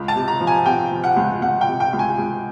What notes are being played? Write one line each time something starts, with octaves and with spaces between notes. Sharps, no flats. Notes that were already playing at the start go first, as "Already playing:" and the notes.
Already playing: C#2
A5
C3
A#5
F3
G#5
C3 G5
F3
F#5
C#2
C#2 F#5
G5
C3
G5
C#2
G#5
C#2